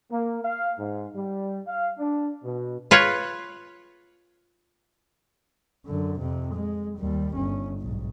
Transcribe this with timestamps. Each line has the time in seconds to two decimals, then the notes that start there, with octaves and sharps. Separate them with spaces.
0.10 A#3
0.44 F5
0.79 G#2
1.16 G3
1.67 F5
1.98 D4
2.43 B2
2.91 F4 B4 C#5
5.86 F#2 D3
6.20 F2 C3
6.55 G#3
6.98 D#2 G3
7.36 G1 C#4
7.80 B1 G#2